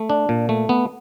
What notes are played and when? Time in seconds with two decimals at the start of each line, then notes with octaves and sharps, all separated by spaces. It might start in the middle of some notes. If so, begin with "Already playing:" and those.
Already playing: A3
0.10 D4
0.29 A#2
0.49 A3
0.69 B3